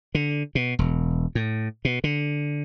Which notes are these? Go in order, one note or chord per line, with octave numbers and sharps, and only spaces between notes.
D3
B2
E1
A2
B2
D3